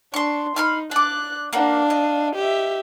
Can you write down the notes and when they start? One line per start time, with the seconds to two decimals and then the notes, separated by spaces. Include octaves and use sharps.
0.14 D4 C6 C#6
0.56 D#4 B5 C6 F6
0.91 D4 D6 F#6
1.53 A#3 D4 F#4 F5
1.90 D#5
2.35 G4 E5